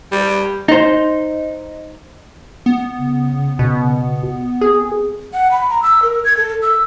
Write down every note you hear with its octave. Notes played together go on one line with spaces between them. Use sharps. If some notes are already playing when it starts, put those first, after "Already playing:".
G3
D#4 C5
B3
C#3
B2
C4 G#4
F#5
B5
A#5
E6
A#4
G#6
A4
E6